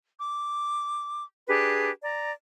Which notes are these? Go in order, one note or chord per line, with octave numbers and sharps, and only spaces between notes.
D6
D4 G4 G#4 B4
D5 A#5